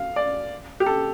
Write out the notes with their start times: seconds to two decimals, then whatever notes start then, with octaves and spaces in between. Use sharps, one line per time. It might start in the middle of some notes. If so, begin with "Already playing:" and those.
Already playing: F5
0.16 D5
0.80 G4
0.86 A4